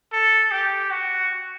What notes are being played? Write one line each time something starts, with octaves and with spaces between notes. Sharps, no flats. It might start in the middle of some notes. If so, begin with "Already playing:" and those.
A4
G4
F#4